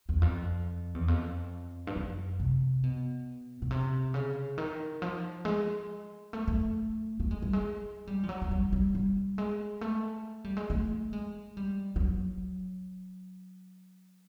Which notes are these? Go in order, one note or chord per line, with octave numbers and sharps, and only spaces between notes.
E2
F2
E2
F2
G2
F#2
C3
B2
B2
C3
C#3
D#3
F3
G#3
A3
A3
A3
G#3
G3
G#3
G3
F3
F#3
F#3
G3
G3
G3
G#3
A3
G3
G#3
A3
G#3
G3
G3
F#3